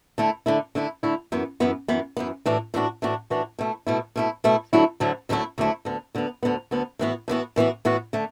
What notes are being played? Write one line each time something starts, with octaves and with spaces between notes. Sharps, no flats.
D3 A3 E4
D3 A3 E4
D3 A3 E4
D3 A3 E4
F#2 E3 B3
F#2 E3 B3
F#2 E3 B3
F#2 E3 B3
A2 E3 D4 F#4
A2 E3 D4 F#4
A2 E3 D4 F#4
A2 E3 D4 F#4
B2 A3 E4
B2 A3 E4
B2 A3 E4
B2 A3 E4
D2 D3 F#3 A3 E4
D2 D3 F#3 A3 E4
D2 D3 F#3 A3 E4
D2 D3 F#3 A3 E4
D2 D3 B3
D2 D3 B3
D2 D3 B3
D2 D3 B3
A2 E3 B3 F#4
A2 E3 B3 F#4
A2 E3 B3 F#4
A2 E3 B3 F#4
D3 A3